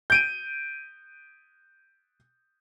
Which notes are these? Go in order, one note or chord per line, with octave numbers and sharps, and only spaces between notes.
G6 D7 D#7